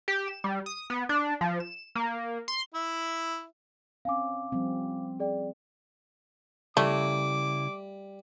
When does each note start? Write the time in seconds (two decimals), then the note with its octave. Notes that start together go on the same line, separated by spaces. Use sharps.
0.08 G4
0.28 E7
0.44 G3
0.66 D#6
0.90 B3
1.09 D4
1.41 F3
1.60 E7
1.95 A#3
2.48 C6
2.74 E4 E5
4.05 C4 C#4 F5 G#5 D6
4.52 F3 G3 C4
5.20 G#4 D5 G5
6.77 C#3 G3 A3 E4 D6